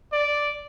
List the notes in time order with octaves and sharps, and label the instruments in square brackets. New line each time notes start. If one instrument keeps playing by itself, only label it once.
[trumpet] D5